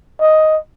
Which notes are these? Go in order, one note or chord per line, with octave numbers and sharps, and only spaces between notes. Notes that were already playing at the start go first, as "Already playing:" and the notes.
D#5